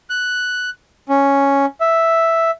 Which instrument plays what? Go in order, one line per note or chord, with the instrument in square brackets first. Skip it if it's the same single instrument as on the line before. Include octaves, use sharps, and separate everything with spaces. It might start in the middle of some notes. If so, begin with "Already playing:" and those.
[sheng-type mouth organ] F#6
C#4
E5